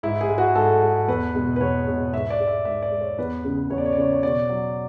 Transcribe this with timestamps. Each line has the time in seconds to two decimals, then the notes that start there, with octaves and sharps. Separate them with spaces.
0.03 G#2 E4
0.21 G#4
0.29 G#3
0.38 F#4
0.55 G#2 A4
0.82 G#3
1.08 E2 B4
1.35 B2 G#3
1.56 B4
1.60 E2 C#5
1.87 B2 G#3
2.13 G#2 E5
2.30 D5
2.40 G#3
2.48 E5
2.65 G#2 E5
2.82 D5
2.91 G#3
3.01 C#5
3.18 E2 B4
3.44 C#3 G#3
3.70 E2 C#5
3.78 D5
3.86 C#5
3.92 D5
3.97 C#3 G#3 C#5
4.12 C#5
4.23 B2 D5
4.49 F#3